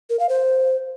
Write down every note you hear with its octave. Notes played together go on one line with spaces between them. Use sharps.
A#4
F5
C5